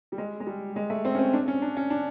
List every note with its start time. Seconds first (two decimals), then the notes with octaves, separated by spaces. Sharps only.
0.12 G3
0.18 G#3
0.40 G#3
0.46 G3
0.76 G#3
0.90 A3
1.05 C4
1.15 C#4
1.19 C4
1.33 D4
1.48 C#4
1.62 D4
1.77 C#4
1.90 D4